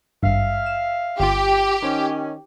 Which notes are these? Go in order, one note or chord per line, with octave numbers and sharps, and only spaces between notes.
G#1 G2 E5 F5
E7
G1 F4 G4
D#3 C#4 D#4 C5